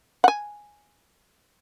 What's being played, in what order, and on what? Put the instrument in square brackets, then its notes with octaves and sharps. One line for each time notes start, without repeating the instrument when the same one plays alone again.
[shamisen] F#5 G#5